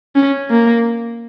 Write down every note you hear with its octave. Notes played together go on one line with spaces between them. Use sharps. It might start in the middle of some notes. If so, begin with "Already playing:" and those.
C#4
A#3